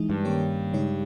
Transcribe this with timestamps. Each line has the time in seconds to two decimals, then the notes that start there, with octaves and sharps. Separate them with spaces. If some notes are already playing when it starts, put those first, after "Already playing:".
Already playing: E3 G#3 D#4
0.10 G2
0.25 D#3 A#3 C#4 G4 C#5
0.73 C#3 G#3 D#4 G4 C#5